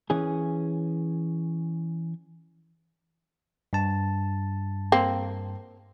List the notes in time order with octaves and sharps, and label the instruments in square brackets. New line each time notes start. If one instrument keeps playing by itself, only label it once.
[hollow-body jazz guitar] E3 C#4 G#4
[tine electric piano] G2 A5
[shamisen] A#3 C4